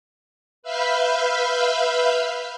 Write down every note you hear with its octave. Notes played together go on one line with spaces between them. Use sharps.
B4 E5 F5 B5 F6 G6